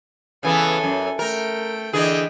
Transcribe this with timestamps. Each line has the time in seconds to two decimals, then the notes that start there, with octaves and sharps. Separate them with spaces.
0.43 C#3 E3 B3 A4 G#5
0.84 F#2
1.19 A3 A#4 G5
1.93 D3 E3 G#4 D#5 G5